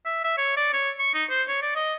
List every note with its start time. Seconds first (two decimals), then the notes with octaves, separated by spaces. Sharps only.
0.06 E5
0.24 E5
0.38 C#5
0.57 D5
0.73 C#5
0.99 C#6
1.14 D#4
1.30 C5
1.48 C#5
1.62 D5
1.76 D#5